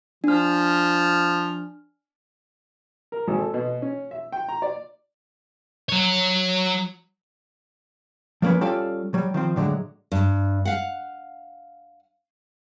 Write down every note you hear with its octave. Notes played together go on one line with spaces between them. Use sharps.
F3 D4 F6
A#4
G#1
A4
B2
C#4
E5
G5
A#5
D5
F#3 C#5
F3 F#3 A#3 C#4 B4
G3 C#4 F4 A4 D5 F5
F#3 G3
D#3 F3 C4
A2 D3 F3 F#3 G#3
G2
F5 F#5